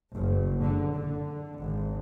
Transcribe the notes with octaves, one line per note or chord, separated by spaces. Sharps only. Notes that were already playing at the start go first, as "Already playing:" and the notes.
F#1
D3
D3
G#1